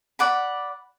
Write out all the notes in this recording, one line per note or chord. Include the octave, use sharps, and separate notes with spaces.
D5 F#5 B5